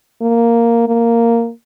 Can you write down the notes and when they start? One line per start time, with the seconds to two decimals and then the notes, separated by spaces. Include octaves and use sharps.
0.22 A#3
0.88 A#3